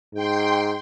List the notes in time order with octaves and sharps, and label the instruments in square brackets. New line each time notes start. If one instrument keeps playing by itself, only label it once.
[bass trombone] G#2 [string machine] G5 C6